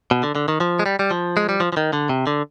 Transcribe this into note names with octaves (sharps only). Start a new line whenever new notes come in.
B2
D3
D3
D#3
F3
G#3
G3
G3
F3
G#3
G3
F3
F3
D#3
D3
C3
D3